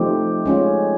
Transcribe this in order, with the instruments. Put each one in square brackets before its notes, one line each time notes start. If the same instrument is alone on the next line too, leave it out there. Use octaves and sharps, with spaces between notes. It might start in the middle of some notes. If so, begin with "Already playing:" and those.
Already playing: [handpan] F3 A3 C4 D#4 G4
G#3 C#4 F4